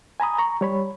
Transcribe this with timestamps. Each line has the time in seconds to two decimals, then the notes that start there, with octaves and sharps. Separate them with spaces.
0.20 G#5 A#5 B5 D#6
0.38 A#5 C#6
0.61 G3 C#5 B5